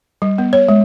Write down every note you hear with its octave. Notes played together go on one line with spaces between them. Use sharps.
G3
B3
C#5
G#3